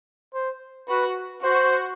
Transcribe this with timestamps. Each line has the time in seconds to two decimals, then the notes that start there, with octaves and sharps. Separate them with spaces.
0.34 C5
0.89 F#4 B4
1.43 F#4 C5